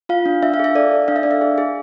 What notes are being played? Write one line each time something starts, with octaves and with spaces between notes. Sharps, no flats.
F4 F5
D4
D4 E5
F5
G#4 E5
A4 D5
A4
D4 F5
E5
D4 D5
E5
G#4
G#4